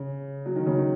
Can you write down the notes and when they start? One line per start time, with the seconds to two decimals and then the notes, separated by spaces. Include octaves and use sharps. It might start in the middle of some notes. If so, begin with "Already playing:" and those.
Already playing: C#3
0.46 F#3
0.56 D#3
0.66 C#3
0.77 D#3